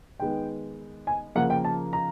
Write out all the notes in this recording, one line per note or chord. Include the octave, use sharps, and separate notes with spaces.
D#3 G#3 B3 G5
G#5
C#3 F3 A#3 F#5
G5
A5
A#5